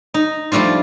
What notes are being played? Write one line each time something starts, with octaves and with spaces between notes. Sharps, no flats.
D#4
F3 G3 A3 D4 F4